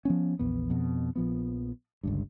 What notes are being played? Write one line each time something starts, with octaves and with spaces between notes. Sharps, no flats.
F3 B3 C#4
A#1 E2 B3
F2 B2
A#1 F3 B3
G1 C#2 G2